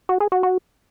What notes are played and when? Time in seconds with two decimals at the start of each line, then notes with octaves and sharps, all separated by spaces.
0.09 F#4
0.20 G#4
0.32 F#4
0.43 F#4